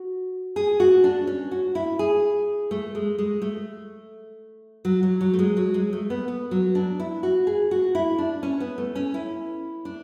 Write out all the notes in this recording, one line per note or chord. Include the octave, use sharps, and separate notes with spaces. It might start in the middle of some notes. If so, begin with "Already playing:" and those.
Already playing: F#4
G#4
F#4
D4
C#4
F#4
E4
G#4
A3
G#3
G#3
A3
F#3
F#3
F#3
A3
G#3
F#3
G#3
A3
B3
B3
F#3
D4
E4
F#4
G#4
F#4
E4
D4
C#4
B3
A3
C#4
E4
D4